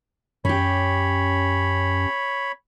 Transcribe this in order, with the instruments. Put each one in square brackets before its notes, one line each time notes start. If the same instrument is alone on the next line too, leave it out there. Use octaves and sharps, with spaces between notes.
[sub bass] F#2 [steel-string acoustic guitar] C#4 G4 [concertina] C#5 B5